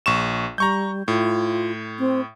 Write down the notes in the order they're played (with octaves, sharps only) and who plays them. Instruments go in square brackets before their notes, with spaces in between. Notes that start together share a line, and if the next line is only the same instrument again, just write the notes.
[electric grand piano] A#1 C#6 E7
[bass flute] G3 [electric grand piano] A#5 C#6 G6
[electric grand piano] A2 [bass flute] F4
[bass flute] C4